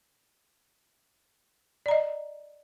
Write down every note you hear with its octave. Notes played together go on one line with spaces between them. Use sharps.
D5 D#5 A#5